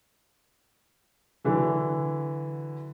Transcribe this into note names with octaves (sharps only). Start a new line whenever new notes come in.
D3 E3 F#3